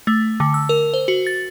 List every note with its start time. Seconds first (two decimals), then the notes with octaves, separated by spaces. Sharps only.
0.07 A3
0.40 D3
0.54 E6
0.69 A#4
0.94 C5
1.08 F#4
1.27 A6